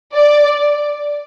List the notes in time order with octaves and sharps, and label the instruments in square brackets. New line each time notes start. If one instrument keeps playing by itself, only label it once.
[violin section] D5